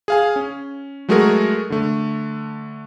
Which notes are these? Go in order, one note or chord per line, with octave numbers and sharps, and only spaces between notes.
G#4 F5 G#5
C#4
F#3 G#3 A3 F#4 G#4 A#4
D3 A3